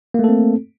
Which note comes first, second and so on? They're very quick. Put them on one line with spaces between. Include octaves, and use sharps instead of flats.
A#3 A3 A4 C4